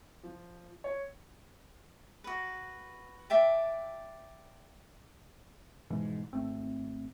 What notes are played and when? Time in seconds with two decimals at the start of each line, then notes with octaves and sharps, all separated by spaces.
0.23 F3
0.84 C#5
2.24 F#4 B4
3.30 D5 E5 G5 A5
5.90 G#2 B2 E3 F3
6.33 G#1 A3 C4